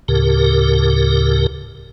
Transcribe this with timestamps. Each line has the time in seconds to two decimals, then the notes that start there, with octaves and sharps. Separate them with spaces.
0.08 D2 A2 C#3 G4 A#4